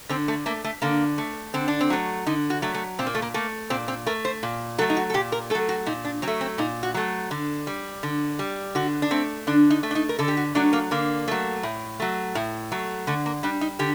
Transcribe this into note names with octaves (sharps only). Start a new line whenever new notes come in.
D3 C4
A3
A3 A#3
A3
D3 A#3
A3
D3 C4
D4
C4
F#3 A3
D3 D#4
F#4
F#3 A3
A3
A#2 C4
A#3
A3
A#3
A3 A#3
A#2 C4
C4
A3 A#4
C5
A#2
F#3 A3 A4
D#4
F#4
A4
A#2 G4
A#4
F#3 A3 A4
F#4
A#2 D#4
D4
F#3 C4
A3
C4
A#2 D#4
F#4
F#3 A3
D3
G3
D3
G3
D3 F#4
D4
A3 C4
D3 D4
D#4
A3
D4
D#4
A#4
D3 A4
G4
F#4
F#3 A3 D4
A#3
D3 A#3
F#3 A3
A2
F#3 A3
A2
F#3 A3
D3 A3
A#3
G3 D4
D#4
D3 G4